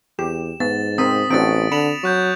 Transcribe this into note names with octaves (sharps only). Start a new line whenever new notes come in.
E2 G4 E7
G#2 B3 A6
C4 A#4 D#6 B6 D#7
A1 C4 D4 F#4 A6 C#7 D7
D3 B5 C#7 E7 F7
F#3 C#6 F#6 G6